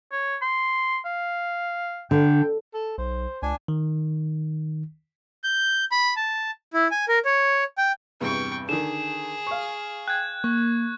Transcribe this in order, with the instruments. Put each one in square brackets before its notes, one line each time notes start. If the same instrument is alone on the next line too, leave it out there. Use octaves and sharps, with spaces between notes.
[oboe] C#5
C6
F5
[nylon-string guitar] D3 [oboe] G5
[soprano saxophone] A4
[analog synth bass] B1 [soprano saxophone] C5
[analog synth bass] C#2 [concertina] D4 G#5
[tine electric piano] D#3
[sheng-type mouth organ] G6
B5
A5
E4
G#5
A#4
C#5
G5
[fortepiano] E2 G2 C3 [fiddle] G5 C#6
[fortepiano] D3 D#3 [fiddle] G#4 [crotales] E7
[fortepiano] F5 C#6
[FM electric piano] G5 [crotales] F#6 G#6
[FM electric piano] A#3 [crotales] C#6